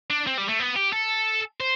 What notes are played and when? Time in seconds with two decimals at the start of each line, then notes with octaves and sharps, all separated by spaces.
0.10 D4
0.27 C4
0.38 G3
0.49 A3
0.60 B3
0.76 G4
0.93 A4
1.60 C5